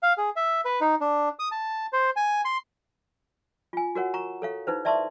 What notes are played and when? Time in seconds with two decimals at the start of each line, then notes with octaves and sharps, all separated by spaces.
0.03 F5
0.18 G#4
0.36 E5
0.65 B4
0.81 D#4
1.01 D4
1.39 D#6
1.52 A5
1.93 C5
2.16 G#5
2.45 C6
3.73 F4 G#5
3.95 F#4 A#4 C#5 F#5
4.14 A#5 C#6
4.42 A4 C#5 F5
4.67 D#4 E4 B4 C5
4.85 D5 E5 A5 C6 C#6 D#6